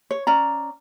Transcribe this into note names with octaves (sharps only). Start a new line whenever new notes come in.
C#5
C#4 D5 A#5